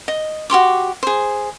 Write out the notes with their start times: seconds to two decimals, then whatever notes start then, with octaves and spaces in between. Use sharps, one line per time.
0.08 D#5
0.50 F#4 G4 C6 D6
1.03 G#4 C5